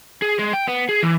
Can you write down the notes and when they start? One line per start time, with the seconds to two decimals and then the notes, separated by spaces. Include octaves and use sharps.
0.22 G#4
0.39 G#3
0.54 G5
0.68 B3
0.89 G#4
1.03 E3